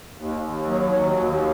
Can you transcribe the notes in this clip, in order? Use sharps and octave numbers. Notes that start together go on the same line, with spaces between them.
D#2
D#2
F#3
D#2
D#2